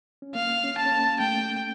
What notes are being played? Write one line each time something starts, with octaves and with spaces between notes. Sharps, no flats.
C#4
A#3 F5
C#4
A5
C#4
A#3
A3 G5